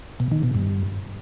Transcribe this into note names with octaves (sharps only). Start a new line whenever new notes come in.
B2
D#3
B2
G2